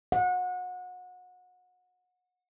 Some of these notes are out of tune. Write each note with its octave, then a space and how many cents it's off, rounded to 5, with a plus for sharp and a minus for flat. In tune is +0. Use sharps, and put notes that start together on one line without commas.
F#5 -30